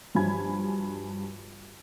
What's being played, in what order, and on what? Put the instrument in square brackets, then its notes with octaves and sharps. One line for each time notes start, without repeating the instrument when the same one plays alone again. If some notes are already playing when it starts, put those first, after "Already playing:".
[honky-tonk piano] G2 F3 F#3 G#5 B5 G#6